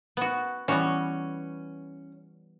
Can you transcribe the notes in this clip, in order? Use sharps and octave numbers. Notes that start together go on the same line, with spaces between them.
B3 F#4
E3 G3 B3 C#4 F#4